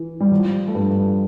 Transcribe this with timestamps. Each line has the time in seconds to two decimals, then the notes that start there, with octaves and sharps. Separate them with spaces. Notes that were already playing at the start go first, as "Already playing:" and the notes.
Already playing: E3
0.20 G3
0.32 F3
0.67 A3
0.74 G2 G3